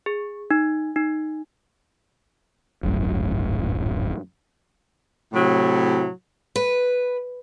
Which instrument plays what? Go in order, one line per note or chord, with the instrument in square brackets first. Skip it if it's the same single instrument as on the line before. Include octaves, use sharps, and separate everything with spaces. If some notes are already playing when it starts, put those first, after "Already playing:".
[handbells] G#4
D#4
D#4
[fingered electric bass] D1 G#1 F#2 A2
[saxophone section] A2 C3 F#3 E4
[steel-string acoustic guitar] B4